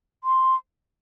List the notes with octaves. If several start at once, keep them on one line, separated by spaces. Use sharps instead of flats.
C6